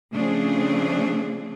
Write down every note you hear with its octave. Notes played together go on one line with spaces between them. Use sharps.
C#3 F3 A3 C4 D4 G#4